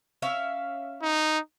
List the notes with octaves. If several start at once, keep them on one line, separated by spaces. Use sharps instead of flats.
C#4 E5 F5
D#4